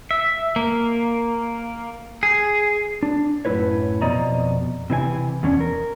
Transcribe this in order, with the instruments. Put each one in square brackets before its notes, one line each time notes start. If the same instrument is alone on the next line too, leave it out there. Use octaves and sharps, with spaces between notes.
[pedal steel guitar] E5
A#3
G#4
[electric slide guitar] D4
F#2 A2 B3 E4 B4 C#5
F2 B2 D5 D#5 A#5
C3 E3 D4 G#5
E2 B2 E3 C#4 D4
A#4